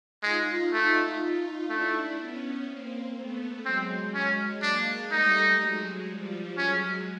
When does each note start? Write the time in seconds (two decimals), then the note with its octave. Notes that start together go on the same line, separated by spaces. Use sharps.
0.23 G#3 D#4 F4
0.72 A3 D#4 F4
1.20 D#4 F4
1.69 A3 D4 E4
2.18 B3 C#4
2.67 A#3 C4
3.16 A3 B3
3.65 F#3 G#3 C4
4.13 F#3 G#3 C#4
4.62 G#3 A#3 D4
5.11 G3 A3 D#4
5.60 F#3 G#3
6.09 F3 G3
6.58 F#3 G#3 C#4